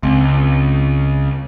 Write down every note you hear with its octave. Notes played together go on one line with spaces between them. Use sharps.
C#2 C4